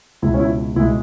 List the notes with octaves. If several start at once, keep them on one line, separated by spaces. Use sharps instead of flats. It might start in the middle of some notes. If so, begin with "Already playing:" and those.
C#2 B2 G#3 E4
C#4
E4
C#2 B2 G#3 E4